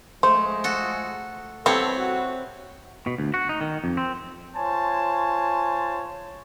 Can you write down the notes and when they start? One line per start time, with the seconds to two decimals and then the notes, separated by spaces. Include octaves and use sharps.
0.23 F3 G#3 A3 C5
0.64 F#4 A4
1.66 G3 B3 C4 E4 A4 C#5
1.98 F#4
3.07 B2
3.18 D2
3.34 F#4
3.49 D#4
3.61 D#3
3.84 F2
3.97 C4
4.56 F4 C5 C#5 G#5 A5